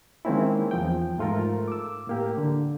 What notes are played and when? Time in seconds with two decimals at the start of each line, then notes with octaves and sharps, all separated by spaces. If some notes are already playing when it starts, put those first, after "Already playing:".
0.25 D#3 G#3 A#3 C4 C#4 E4
0.71 E2 F3 G5
1.18 G#2 A3 F4 A4 A#4
1.68 D6 E6
2.07 A2 A#3 G4
2.37 D3